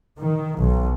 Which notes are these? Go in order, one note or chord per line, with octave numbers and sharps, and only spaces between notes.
D#3
B1